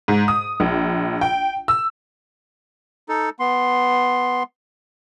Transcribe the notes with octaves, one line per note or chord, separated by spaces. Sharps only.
G#2
D#6
A#1
G5
E6
D#4 A4
B3 C6